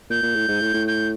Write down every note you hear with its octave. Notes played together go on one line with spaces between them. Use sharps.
A#2 G6
A#2
A2
G#2
A2
A2
G6